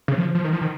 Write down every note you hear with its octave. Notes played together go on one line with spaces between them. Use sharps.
C#3
F3
F3
D#3
F3
D#3